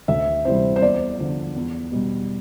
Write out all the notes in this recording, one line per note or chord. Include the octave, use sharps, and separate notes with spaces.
D2 E5
C3 E3 G3 C5
C5
E2 D5
D3 F3
E2
B2 G3